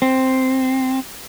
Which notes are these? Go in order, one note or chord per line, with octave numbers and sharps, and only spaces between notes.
C4